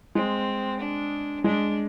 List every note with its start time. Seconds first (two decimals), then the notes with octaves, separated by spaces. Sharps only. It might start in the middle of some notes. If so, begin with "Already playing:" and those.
0.15 G#3 C4
0.80 D4
1.44 G#3 D4